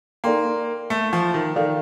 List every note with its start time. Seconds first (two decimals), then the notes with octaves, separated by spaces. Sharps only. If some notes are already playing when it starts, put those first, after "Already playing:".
0.24 A#3 D#4 A4 D5 G5 C6
0.90 A3
1.13 F3
1.34 D#3
1.56 D#3 A4 D5 F5